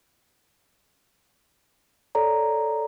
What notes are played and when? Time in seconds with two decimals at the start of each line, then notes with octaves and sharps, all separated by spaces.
2.15 A4 C#5 D5 A#5